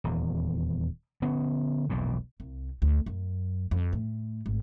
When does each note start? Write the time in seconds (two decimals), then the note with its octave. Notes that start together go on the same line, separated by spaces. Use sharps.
0.04 D#1 E2
1.22 D3 B3 C#4
1.90 E1 B1 F2 A#2
2.40 C2
2.82 D2
3.06 F#2
3.71 F2
3.93 A2
4.46 G#1